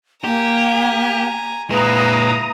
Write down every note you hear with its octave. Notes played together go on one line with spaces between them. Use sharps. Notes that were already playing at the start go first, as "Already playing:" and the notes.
A#3 G4 G#5 A#5
A#2 G#3 E4 B4 F5 A#5 D#6